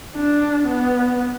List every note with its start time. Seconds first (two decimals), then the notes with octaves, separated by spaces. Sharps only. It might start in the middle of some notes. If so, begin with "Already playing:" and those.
0.15 D4
0.67 B3